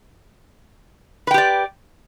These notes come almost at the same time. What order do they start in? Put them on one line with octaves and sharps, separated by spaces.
B4 G5 G4 D5